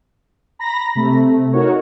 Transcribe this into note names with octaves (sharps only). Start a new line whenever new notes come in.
A#5 B5 A#6
C3 A3
D#4 F#4 A#4 C#5